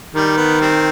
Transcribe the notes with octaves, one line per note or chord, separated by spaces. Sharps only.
D#3 G3
B3
G3 C4